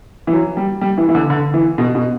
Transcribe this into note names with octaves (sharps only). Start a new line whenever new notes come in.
E3
F#3
G3
G3
E3
E3
D3
D3
E3
B2
B2